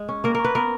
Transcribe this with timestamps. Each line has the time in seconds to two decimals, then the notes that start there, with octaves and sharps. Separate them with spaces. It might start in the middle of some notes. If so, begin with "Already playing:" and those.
Already playing: G#3
0.09 C#4
0.24 A#3 A#4
0.35 C#4 A#4
0.44 B4
0.55 B3 A#4